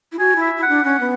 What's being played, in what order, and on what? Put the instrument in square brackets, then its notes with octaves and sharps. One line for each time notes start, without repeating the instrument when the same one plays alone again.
[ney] E4
[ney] F#4 [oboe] G#5
[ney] E4
[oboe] E5
[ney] E4
[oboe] F#5
[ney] D4
[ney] C#4 [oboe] F#5
[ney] B3